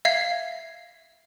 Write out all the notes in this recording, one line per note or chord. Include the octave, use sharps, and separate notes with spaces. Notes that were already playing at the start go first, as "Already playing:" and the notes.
E5 F5 G#6 C7